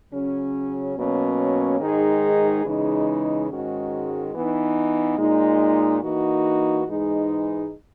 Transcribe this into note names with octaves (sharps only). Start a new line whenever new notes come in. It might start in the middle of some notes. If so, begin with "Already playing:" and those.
C#3 F#3 C#4
B2 F#3 A#3 C#4
G#2 D#3 G#3 D#4 G#4
C#3 E3 G#3 D#4
G#2 D#3 G#3 C#4 F#4
E3 B3 D#4
A#2 G#3 D#4
E3 A#3 D#4 F#4
G#2 E3 G#3 D#4 G#4